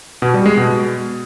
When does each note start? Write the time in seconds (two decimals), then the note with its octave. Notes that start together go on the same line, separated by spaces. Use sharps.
0.22 B2
0.34 G3
0.46 G#3
0.57 B2